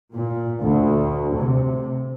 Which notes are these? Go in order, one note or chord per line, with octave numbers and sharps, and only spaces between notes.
A#2
D2
C3